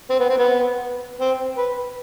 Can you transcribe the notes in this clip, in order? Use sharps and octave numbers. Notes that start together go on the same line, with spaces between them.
C4
B3
C4
B3
C4
B4